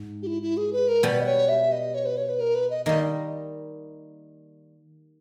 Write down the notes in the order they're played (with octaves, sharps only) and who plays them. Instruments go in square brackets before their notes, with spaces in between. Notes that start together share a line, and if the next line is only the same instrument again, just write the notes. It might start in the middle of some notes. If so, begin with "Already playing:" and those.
Already playing: [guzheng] G#2
[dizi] G4
E4
E4
G#4
B4
A#4
[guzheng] B2 G3 B3 [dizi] B4
[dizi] D#5
C#5
E5
D#5
C#5
B4
C#5
B4
A#4
B4
D#5
[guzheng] D#3 G3 A#3 D#4 [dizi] D#5